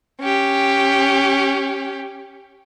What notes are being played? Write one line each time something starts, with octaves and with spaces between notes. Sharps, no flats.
C#4 G4